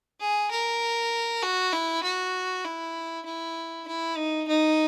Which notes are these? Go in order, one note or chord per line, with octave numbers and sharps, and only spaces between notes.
G#4
A#4
F#4
E4
F#4
E4
E4
E4
D#4
D#4